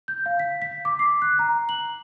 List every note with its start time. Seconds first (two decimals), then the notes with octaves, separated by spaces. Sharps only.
0.08 G6
0.26 F5
0.39 B6
0.62 B6
0.85 D6
0.99 C7
1.22 F#6
1.39 A#5
1.69 F#7